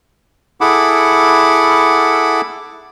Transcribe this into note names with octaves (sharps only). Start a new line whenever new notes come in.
E4 G#4 A4 F#5 B5 D6